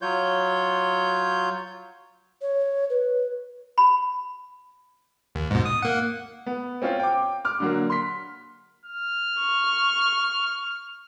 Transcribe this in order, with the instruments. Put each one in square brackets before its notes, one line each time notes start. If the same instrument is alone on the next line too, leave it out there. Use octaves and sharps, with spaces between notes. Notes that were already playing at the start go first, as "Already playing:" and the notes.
[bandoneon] F#3 F4 C#5 G6
[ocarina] C#5
B4
[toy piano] B5
[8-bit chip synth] D#2
G#2 B2
D#6
A#3 F#5
[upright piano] B3
C4 C#4 F4
G5 D6
D6 F6
D3 F#3 A#3
C6 B6
[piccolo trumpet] F6
[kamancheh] C#6